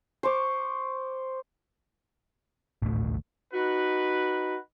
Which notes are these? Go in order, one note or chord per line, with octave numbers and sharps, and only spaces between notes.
C5 C#6 D6
G#1 D2 A2 A3
D#4 F#4 B4